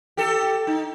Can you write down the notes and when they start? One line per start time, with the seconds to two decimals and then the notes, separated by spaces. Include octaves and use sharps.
0.17 G4 A4
0.67 D#4